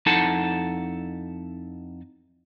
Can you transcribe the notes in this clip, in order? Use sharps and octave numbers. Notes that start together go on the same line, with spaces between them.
F2 D#4 E4 A4 F#5 A5